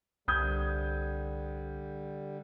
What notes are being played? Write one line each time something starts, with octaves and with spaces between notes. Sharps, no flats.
C2 D3 G3 D#6 G6 G#6